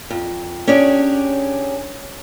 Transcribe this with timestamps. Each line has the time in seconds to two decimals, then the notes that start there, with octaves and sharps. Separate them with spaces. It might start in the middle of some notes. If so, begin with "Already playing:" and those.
0.10 F2
0.67 C#4 D4 G4 G#4 C#5